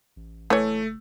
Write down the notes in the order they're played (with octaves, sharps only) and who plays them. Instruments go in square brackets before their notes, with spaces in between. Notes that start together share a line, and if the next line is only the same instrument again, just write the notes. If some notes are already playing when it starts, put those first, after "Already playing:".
[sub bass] A1
[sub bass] F#1 [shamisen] E3 C#5 [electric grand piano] A3